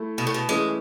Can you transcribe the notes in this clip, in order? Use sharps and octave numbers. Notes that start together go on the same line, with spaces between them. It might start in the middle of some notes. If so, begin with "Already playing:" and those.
Already playing: A3 E4 A4
B2
A2
B2
E3 G#3 A3 C#4